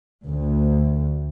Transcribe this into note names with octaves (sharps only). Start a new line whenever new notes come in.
D2